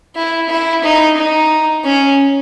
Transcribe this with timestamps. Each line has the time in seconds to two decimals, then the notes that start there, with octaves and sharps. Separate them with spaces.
0.15 E4
0.49 E4
0.83 D#4
1.17 D#4
1.84 C#4